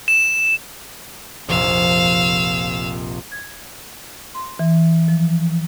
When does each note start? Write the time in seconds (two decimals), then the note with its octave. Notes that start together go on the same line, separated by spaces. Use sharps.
0.08 E7
1.48 F1 A#1 F5 E6
3.32 G#6
4.35 C6
4.59 E3
5.08 F3